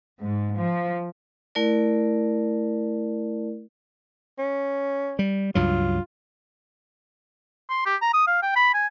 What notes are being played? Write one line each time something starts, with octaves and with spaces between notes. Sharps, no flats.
G#2
F3
A3 E4 A#4 D5
C#4
G3
C#2 G2 F#3 F4
C6
G4
A#5
D#6
F5
G5
B5
G#5